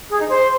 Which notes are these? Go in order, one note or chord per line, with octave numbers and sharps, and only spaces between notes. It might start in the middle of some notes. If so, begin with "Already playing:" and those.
G#4
D#4
C5